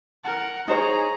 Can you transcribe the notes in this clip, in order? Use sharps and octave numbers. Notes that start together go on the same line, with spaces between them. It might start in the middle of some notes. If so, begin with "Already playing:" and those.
A#4 F#5
D#4 G#4 C5 C#5 A#5